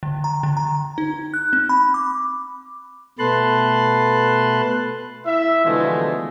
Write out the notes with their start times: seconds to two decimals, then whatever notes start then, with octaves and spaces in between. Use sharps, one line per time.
0.03 D3
0.24 A#5
0.43 D3
0.57 A#5
0.98 D#4
1.34 F#6
1.53 C4
1.69 B5
1.94 D6
3.19 B2 A3 B4 A5 C6 F#6
5.26 E4 E5
5.65 B2 D3 E3 F3 G#3 A3